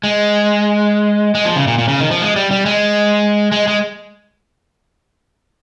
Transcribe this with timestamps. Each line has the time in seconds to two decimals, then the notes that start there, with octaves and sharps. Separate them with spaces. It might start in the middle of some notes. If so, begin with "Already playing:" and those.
0.04 G#3
1.35 G#3
1.45 F3
1.56 C#3
1.67 A#2
1.78 A#2
1.88 C#3
2.00 D#3
2.11 F3
2.22 G#3
2.36 G3
2.51 G3
2.66 G#3
3.52 G#3
3.67 G#3